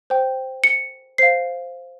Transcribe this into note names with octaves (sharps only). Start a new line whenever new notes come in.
C5 G5
C#7
C5 F5 C7